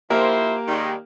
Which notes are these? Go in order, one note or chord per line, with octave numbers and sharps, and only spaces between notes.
F3 A#3 E4 G4 A#4 C5
D#3 G3 G#3